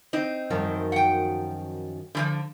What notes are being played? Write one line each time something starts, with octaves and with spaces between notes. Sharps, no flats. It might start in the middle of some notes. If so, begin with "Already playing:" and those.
C4 D#4
F#2 D#3 F3
F#5 G5
D3 E3 F3